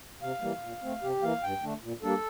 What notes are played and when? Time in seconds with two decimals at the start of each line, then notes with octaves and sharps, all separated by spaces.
0.22 C3 F5
0.42 E3 G3 A#3
0.63 A#2
0.82 A3 C4
1.02 C3 G4
1.22 E3 A#3 F5
1.43 G2 G5
1.63 D3 A3 D4
1.83 A#2
2.03 G3 A#3 D4 A4